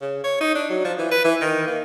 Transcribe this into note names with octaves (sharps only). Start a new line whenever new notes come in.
C#3
C#5
D#4
D4
F#3
F3
E3
B4
E3
D#3
A#3